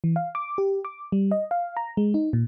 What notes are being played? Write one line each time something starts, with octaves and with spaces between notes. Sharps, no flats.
E3
F5
D6
G4
D6
G3
D#5
F5
A#5
G#3
D#4
A#2